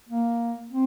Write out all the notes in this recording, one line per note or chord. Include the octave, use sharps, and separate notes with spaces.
A#3
C4